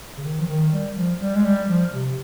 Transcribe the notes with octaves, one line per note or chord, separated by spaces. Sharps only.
C#3
D#3
F3
D#3
G3
F3
G3
G#3
G3
F3
C3